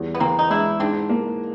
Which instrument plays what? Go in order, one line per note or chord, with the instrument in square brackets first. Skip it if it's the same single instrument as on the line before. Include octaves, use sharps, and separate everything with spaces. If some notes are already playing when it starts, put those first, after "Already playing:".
Already playing: [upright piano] E2 G3
[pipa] B3
[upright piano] E3 [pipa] A#3 C4
[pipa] D#4
[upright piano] G#3 [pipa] D4 E4
[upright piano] G#2 [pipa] C4 D4
[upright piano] A#3